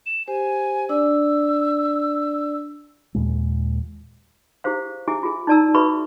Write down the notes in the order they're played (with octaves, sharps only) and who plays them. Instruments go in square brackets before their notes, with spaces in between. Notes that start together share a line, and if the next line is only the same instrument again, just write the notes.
[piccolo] E7
[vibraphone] G4 C5 [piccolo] G#5
[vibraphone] D4 D5 [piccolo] E6
[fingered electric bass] D#2 A#2 G#3
[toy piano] E4 G4 G#4 C5 F5
E4 G4 G#4 E5 G#5 D6
F4 G#4
D#4 E4 D5 A5 A#5 E6
F#4 G#4 B4 E5 B5 C#6